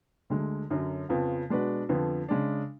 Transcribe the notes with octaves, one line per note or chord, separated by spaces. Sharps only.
D2 D3 G#3
F#2 D3 F#3
F2 C#3 F3 B3 F4
B2 G#3 D4 F#4 B4
F2 D3 F3 B3
C#3 G#3 D4